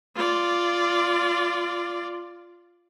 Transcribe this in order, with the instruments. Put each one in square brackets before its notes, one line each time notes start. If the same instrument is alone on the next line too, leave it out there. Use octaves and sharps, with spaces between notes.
[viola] F4 D5